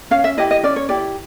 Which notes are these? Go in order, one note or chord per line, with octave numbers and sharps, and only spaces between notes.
C#4 F5
E5
E4 G4 D#5
D#5
C#4 D5
C#5
E4 G4 D5